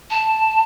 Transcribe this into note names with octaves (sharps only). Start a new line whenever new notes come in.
A5